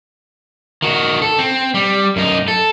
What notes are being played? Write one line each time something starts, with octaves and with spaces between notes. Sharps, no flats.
D#3 F#4
A4
C4
G3
F#2 D#4
A4